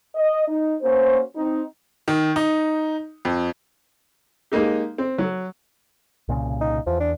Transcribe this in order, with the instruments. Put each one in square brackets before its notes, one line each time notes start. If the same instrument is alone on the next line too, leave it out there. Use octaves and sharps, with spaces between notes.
[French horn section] D#5
D#4
A#3 C#4 F#4 C5
C4 D#4
[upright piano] D#3
D#4
F2
[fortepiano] G#3 A#3 D#4 G4
C4
F#3
[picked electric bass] C2 A#2 C#3
[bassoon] D#4
[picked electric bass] E2 [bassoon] F3
[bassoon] D4